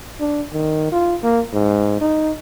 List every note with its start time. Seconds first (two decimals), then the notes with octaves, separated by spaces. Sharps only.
0.20 D4
0.53 D#3
0.92 F4
1.23 A#3
1.53 G#2
2.01 D#4